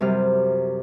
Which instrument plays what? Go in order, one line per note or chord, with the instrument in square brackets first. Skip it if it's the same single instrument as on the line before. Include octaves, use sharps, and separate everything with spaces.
[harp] F#2 C3 G3 F6